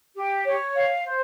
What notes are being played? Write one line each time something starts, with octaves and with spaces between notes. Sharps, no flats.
G4
C#5
F5
C5